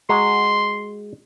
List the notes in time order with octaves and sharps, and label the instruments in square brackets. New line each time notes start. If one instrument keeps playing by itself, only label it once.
[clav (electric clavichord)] G#3 F#4 A#5 [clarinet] C6